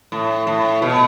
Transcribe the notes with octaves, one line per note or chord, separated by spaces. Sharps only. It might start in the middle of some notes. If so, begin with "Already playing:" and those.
A2
A2
B2